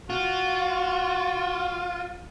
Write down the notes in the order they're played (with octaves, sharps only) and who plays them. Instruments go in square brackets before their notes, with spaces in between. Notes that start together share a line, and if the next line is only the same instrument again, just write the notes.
[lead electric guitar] F4 [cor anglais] F#4